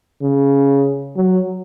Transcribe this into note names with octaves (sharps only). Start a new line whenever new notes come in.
C#3
F#3